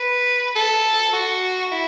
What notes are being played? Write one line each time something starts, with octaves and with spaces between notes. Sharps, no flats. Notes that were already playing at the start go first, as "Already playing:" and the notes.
Already playing: B4
A4
F#4
E4